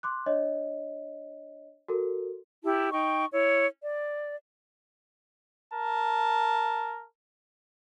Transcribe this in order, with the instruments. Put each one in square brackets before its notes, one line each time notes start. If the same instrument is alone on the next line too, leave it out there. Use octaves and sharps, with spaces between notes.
[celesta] C6 D6 F#6
D4 C#5 D#5
F#4 A4 A#4
[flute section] E4 G4 A5
D#4 G5 C#6
E4 C#5
D5
[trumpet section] A#4 A5